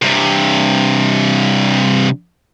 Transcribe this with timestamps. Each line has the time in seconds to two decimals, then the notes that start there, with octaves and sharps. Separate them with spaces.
0.02 G2 C3